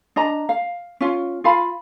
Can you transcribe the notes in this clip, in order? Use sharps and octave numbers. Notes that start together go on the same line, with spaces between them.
D4 D#5 A#5
F5
C#4 F4
F4 F5 B5